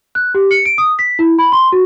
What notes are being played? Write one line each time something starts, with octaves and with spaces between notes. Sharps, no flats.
F#6
G4
C#7
D7
D#6
B6
E4
B5
C6
F#4